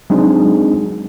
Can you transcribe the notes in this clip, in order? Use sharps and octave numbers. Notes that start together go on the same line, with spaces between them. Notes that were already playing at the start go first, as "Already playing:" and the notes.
F#3 G#3 C4 D4 D#4 G#4